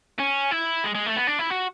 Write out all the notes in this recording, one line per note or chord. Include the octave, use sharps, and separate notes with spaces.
C#4
E4
G#3
G#3
A3
B3
D4
E4
F#4